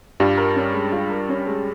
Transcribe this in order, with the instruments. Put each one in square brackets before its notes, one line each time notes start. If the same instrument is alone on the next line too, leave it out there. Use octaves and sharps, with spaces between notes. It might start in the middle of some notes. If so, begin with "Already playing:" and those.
[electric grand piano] G2 G3 [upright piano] F4
[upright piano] A#4
C#4
G#3
F4
A#4
C#4
G#3